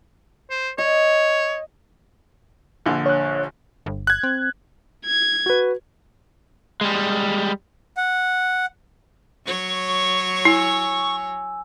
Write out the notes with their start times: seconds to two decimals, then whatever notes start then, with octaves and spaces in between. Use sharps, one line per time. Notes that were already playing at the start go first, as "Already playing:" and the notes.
0.50 C5
0.78 C#5 D#5
2.86 A#1 D3
3.06 C#5 F#6
3.86 G1
4.07 F#6 G#6
4.23 C4
5.06 G#6
5.46 F#4 B4
6.81 G3 G#3
7.97 F#5
9.46 F#3 C#5 C#6
10.45 E4 G#5 E6